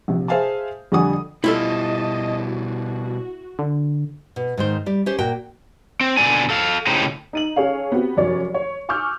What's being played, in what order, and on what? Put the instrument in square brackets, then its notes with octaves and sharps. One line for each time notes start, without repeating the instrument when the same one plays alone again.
[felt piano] A#1 C3
G#4 C5 E5 F5 G#5 A5
F2 D3 G3 F#5 G#5 D#6
[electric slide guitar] B2 G3 [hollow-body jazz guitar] E4 F4 A4 [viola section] D#5 A5
[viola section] F#4
[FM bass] D3
[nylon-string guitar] B2
G#2 D#3 C5
G3 D5
C#4 G4 C5
A#2 F#4 A#4 G5
[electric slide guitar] C4
B2 D3 G#3 D5 G#5
A4 F5
A2 C#3 A#3 D#4 G4 C5
[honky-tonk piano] D#4 D#7 F#7
C#4 G#4 A4 C#5 F5
B3 C4 F#4 G4
F1 F#2 C#5 D5
C#5
G#5 C#6 D6 E6 F6 G6